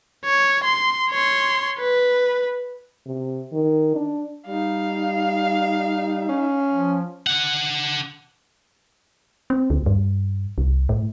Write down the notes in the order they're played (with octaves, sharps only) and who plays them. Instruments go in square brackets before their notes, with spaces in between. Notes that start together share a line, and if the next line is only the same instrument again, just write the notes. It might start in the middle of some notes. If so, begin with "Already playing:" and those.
[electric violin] C#5
C6
C#5 C6
B4
[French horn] C3
D#3
D4
[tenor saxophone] G3 [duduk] D#4 [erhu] F5
[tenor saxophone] C#4
[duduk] F3
[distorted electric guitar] D4 F#5
[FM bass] C4
D2
G2
C2
A2